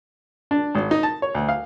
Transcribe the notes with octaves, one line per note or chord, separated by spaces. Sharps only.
D4
G#1
D#4
A5
C#5
D2
F5